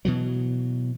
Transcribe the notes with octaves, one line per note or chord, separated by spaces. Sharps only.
B2 E3 F#3